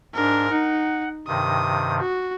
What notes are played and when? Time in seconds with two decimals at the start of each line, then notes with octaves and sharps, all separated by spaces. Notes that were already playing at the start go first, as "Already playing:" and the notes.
0.15 G#2 D4 A#4
0.51 D#4 F#5
1.27 G2 C3 D#3 D#6
2.00 F#4